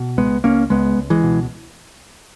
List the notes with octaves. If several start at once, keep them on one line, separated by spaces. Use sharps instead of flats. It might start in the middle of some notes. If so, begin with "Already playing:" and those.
Already playing: B2
C#2 G#3 B3
C#2 A#3 C#4
C#2 G#3 B3
C#2
E3 G#3
B2